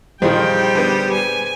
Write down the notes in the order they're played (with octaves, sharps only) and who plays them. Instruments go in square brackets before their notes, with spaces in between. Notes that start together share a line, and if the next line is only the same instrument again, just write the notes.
[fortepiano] F2 D#3 [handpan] A#2 G#4 C5 [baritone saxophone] G3 [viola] G5
[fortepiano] D3 B3
[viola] G#5